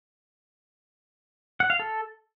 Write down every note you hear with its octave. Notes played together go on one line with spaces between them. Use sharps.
F#5
F5
A4